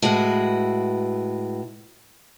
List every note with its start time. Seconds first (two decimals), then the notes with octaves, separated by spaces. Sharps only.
0.02 A2 G#3 F#4 B4